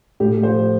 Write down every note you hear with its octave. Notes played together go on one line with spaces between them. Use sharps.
A2 G4
F3 C5